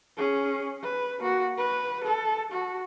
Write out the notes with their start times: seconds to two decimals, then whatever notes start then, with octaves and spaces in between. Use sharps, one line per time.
0.17 C#4 G#4
0.82 B4
1.19 A#3 F#4
1.58 B4
2.04 A4
2.52 F#4